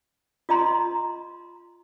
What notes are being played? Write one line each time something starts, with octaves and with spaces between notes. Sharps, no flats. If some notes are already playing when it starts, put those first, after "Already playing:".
F4 D#5 A#5 C6